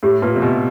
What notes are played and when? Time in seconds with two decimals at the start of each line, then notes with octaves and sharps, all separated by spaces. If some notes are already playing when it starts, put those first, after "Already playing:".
0.03 A2 G4
0.22 A#2 B4 E5 A5
0.36 C3
0.41 B2 G4